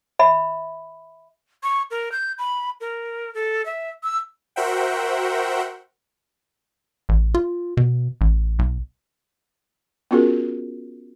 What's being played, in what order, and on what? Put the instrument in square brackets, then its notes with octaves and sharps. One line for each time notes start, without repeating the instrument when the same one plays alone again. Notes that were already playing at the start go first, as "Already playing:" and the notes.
[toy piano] E5 B5
[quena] C#6
A#4
G6
B5
A#4
A4
E5
E6
[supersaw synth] F#4 A#4 C5 E5 F#5 G5
[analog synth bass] A1
F4
B2
A1
B1
[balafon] B3 C#4 F4 F#4 G#4 A#4